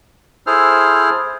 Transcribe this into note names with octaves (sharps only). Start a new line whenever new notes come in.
E4 G#4 A4 C5 F6